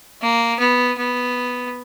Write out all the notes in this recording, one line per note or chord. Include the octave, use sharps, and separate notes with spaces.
A#3
B3
B3